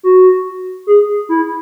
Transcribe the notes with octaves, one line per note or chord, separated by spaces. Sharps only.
F#4
G#4
E4